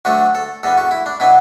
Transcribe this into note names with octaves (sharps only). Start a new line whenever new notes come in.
D2 D3 F#3 A3 D4 F#4
A4
E2 D3 B3 A4
F#4
E4
D4
B2 F#3 B3 D4 E4